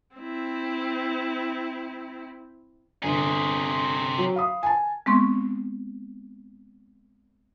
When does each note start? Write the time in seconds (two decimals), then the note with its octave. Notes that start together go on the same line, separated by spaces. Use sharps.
0.16 C4 E4
3.03 G1 C3 G#4
4.18 F#3
4.36 F5 B5 D#6
4.63 G#5 A5
5.06 G#3 B3 C4 C6 C#6